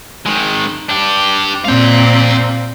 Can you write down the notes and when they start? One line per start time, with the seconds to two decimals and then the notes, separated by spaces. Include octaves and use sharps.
0.26 D#3 G#3
0.89 D4 G4
1.65 A#2 C4 F5 G5